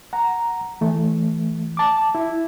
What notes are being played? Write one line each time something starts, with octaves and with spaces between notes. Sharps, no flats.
F#5 A#5
E3 A3
A5 D6
E4